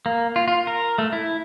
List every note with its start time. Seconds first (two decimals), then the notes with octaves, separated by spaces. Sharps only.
0.06 A#3
0.36 F4
0.48 F4
0.67 A#4
0.98 A3
1.13 E4